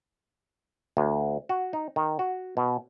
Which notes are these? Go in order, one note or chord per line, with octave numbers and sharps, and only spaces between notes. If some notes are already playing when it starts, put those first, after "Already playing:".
D2
F#4
D#4
D#3
F#4
B2